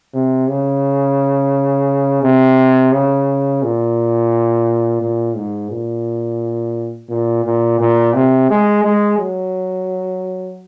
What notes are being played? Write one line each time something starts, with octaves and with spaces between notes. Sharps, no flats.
C3
C#3
C3
C#3
A#2
A#2
G#2
A#2
A#2
A#2
A#2
C3
G#3
G#3
F#3